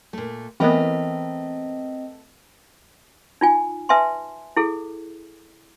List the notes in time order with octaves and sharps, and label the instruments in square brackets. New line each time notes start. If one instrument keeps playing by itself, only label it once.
[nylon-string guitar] A#2 A3
[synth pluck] E3 B3 [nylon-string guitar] A3 A#4 B4 [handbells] C4 D#5
[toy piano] D#4 F4 G#5
B4 E5 G#5 A5 C6
E4 G#4 A4